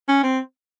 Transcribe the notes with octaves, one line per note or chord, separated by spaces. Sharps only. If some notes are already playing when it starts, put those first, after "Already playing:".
C#4
C4